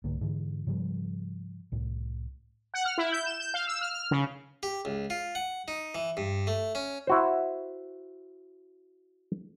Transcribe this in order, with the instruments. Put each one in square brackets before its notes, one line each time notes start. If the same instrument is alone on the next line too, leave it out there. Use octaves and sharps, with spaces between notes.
[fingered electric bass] C2 G#2 D3 A#3
G#2 D3 E3
G#2 C#3 F3 G3
C2 A2
[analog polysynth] F#5
F6
E4
G6
E7
G6
F5
E6
F6
F6
C#3
[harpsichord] G4
C#2
F4
F#5
D#4
E3
G2
A3
C#4
[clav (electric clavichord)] E4 F#4 C5